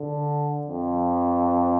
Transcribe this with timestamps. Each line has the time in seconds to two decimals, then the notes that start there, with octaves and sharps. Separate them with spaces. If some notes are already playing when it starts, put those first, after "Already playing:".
Already playing: D3
0.67 F2